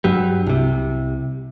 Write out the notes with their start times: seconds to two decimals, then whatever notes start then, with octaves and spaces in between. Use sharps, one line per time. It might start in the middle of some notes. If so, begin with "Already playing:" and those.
0.04 G2 F#3 G3
0.46 C2 C3